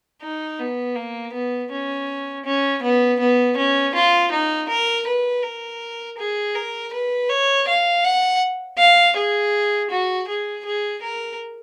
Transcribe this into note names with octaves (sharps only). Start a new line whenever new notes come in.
D#4
B3
A#3
B3
C#4
C#4
B3
B3
C#4
F4
D#4
A#4
B4
A#4
G#4
A#4
B4
C#5
F5
F#5
F5
G#4
F#4
G#4
G#4
A#4